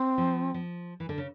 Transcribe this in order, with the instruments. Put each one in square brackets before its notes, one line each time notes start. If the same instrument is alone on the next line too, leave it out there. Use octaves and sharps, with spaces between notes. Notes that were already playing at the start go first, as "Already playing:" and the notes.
Already playing: [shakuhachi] C4
[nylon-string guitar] F3
F3
E3
D3
C#3